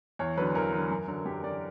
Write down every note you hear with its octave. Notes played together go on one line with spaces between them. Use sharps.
E2 C#5
D3 F#3 B4
E2 A#4
D3 F#3
F#2
D3 F#3
F#2 G4
D3 F#3 D5